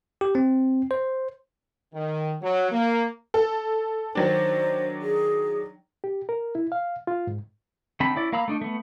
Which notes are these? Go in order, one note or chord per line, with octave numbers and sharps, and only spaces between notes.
G4
C4
C5
D#3
F#3
A#3
A4
D#3 F#3 D4 C5
G#4
G4
A#4
E4
F5
F4
G#2
D3 C4 D#4 A5 B5
C#4 E4 D5
A#3 F5 A#5 B5 E6
A3 D4 D#4
A3 B3